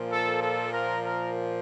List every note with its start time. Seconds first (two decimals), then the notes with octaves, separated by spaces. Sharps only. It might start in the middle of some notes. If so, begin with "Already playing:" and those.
Already playing: A#2 F3
0.11 A4
0.42 A4
0.72 A#4
1.03 A#4